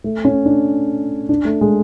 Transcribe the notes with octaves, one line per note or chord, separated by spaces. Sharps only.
A3
C#4
D4
D4
A3
G#3